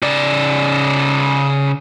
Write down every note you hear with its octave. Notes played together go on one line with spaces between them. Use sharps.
C#3 D5